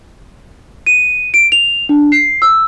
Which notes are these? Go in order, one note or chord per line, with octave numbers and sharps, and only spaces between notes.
D#7
D7
F7
D4
C7
E6